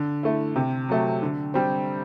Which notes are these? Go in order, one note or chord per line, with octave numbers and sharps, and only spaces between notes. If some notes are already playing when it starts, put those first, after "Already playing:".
Already playing: D3
A3 E4
C3
F#3 A3
D3
G3 C4